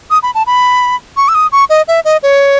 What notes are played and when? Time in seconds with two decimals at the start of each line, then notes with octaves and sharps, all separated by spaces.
0.10 D#6
0.23 B5
0.35 A5
0.47 B5
1.17 C#6
1.28 E6
1.35 D#6
1.52 C#6
1.70 D#5
1.88 E5
2.05 D#5
2.23 C#5